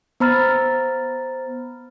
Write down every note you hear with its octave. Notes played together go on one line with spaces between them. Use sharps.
B3 C5 A#5 B5 F6 A6